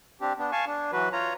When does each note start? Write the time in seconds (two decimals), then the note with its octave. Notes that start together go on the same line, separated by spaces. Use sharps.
0.21 C4 D4 G4
0.39 B3 D4
0.52 F5 G#5 A5 C#6
0.66 D4
0.93 E3 F#3 F#4 B4
1.13 F4 C#5 A#5